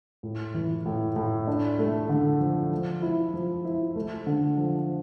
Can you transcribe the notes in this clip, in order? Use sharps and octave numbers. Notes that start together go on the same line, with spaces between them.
A2
E3
A2
A2
D4
A3
D3
F3
F3
E4
F3
E4
A3
D3
F3